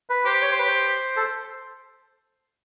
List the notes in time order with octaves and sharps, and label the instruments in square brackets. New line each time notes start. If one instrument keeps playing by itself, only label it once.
[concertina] B4
[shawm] G4 [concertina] C5
[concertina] C#5
C5
B4
C5
A4